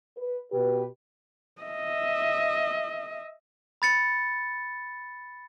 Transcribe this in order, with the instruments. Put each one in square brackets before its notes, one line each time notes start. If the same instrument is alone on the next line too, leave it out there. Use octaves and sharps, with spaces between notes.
[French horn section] B4
B2 G4 B4
[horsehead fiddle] D#5 E5
[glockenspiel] B5 A6 C#7